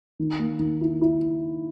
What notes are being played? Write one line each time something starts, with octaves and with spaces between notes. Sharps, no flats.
D#3
A#3
D#3
E4
E4